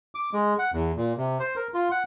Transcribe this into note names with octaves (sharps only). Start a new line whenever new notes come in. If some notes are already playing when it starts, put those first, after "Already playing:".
D6
G#3
F#5
E2
A#2
C3
C5
A#4
F4
F#5